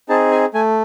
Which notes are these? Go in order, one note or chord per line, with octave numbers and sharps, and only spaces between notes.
C4 D#4 G#4 A5
G#5
A3 G#5